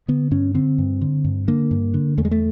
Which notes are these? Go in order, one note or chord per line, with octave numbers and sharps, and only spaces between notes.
D3 B3
G2 C#4
D3 C4
G2
D3
G2
D3 A#3
G2
D3
E2 A3
G#3
A3